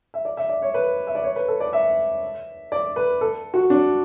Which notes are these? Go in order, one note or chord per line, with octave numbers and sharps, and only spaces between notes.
E5
D5
E5
D5
C#5
B4
E5
D5
C#5
B4
A4
D5
E5
D5
B4
A4
F#4
D4